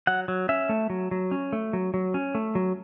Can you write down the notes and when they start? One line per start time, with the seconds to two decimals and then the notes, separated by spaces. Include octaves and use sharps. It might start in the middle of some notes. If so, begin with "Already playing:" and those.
0.07 F#3 F#5
0.28 F#3
0.49 C#4 E5
0.69 A3
0.90 F#3
1.11 F#3
1.31 C#4
1.53 A3
1.73 F#3
1.94 F#3
2.14 C#4
2.35 A3
2.55 F#3